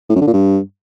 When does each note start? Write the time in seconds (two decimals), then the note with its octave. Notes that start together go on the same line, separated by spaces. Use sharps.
0.10 A2
0.15 F#2
0.21 D3
0.27 A#2
0.33 G2